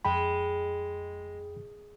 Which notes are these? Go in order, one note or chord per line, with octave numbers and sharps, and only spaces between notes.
F2 G#3 G5 B5